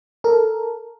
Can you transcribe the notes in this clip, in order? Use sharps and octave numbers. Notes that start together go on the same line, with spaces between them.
A4 A#4